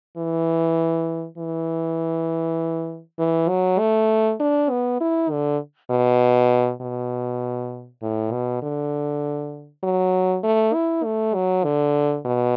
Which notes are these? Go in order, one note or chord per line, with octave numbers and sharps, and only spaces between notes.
E3
E3
E3
F#3
A3
D4
B3
E4
D3
B2
B2
A2
B2
D3
F#3
A3
E4
A3
F#3
D3
B2